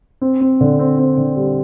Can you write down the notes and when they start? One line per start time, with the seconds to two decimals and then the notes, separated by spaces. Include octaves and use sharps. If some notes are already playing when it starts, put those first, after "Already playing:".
0.21 C4
0.41 C4
0.61 D3
0.79 C4
0.99 C4
1.17 D3
1.36 G3